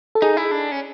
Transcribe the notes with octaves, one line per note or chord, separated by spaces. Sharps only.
A4
D#4 G#4
E4
D4
C#4